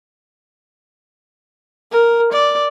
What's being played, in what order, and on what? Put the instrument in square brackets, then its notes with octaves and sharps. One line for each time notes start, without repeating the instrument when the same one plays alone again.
[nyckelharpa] A#4
D5